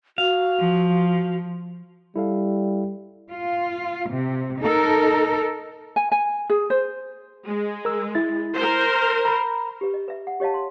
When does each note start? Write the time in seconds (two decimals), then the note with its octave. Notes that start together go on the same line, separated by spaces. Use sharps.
0.18 F#4 F5
0.59 F3
2.16 G3 E4 A4 F5
3.31 F4
4.10 C3
4.61 D#4 A4 A#4
5.96 G#5
6.12 G#5
6.50 G#4
6.70 C5
7.46 G#3
7.85 A#4 E6
8.15 E4 A6
8.54 A#4 C5
9.25 A#5 B5
9.81 G4 B4
9.94 D#5
10.08 B4 E5
10.27 F#5
10.40 G4 C#5 D#5 F5 A5
10.54 C6